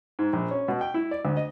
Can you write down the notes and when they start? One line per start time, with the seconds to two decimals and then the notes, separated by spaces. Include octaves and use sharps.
0.19 G#2
0.33 A#1
0.51 C#4
0.68 B2
0.81 G5
0.94 E4
1.11 D5
1.25 D2
1.37 D#5